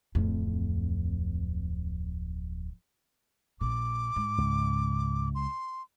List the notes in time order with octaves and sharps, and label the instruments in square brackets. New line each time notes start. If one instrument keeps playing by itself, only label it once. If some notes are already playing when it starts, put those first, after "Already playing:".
[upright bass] D1 F2
[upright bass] A#1 A#2 [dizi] D6
[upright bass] G#2
[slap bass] C#2
[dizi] C6